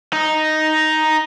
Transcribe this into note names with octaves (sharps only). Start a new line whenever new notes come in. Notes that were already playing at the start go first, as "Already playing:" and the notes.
D#4